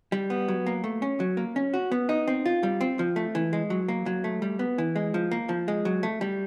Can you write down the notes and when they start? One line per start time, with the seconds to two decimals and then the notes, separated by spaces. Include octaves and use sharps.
0.12 G3
0.30 B3
0.48 F#3
0.66 A#3
0.84 A3
1.02 C#4
1.20 F#3
1.37 A#3
1.56 C#4
1.74 F#4
1.92 B3
2.09 D#4
2.28 C4
2.46 F4
2.63 G3
2.81 C4
2.99 F3
3.16 A3
3.35 E3
3.53 G#3
3.70 F#3
3.88 A#3
4.06 F#3
4.24 A3
4.42 G3
4.59 B3
4.78 E3
4.96 G#3
5.14 F3
5.31 A#3
5.49 F3
5.68 G#3
5.85 F#3
6.03 A3
6.21 G3